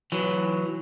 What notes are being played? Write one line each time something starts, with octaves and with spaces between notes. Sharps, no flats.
E3 F#3